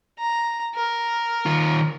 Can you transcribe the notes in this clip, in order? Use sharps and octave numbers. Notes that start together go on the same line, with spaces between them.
A#5
A#4
D#3 F4